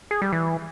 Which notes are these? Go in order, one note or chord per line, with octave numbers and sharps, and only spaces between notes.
G#4
G3
E3